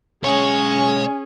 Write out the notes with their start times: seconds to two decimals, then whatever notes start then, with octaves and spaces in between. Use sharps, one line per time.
0.24 B1 G#3 C#4 G#4 C#5 G#5